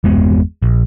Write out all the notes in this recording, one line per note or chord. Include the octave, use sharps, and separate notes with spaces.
G1 E2 G#3 B3
A#1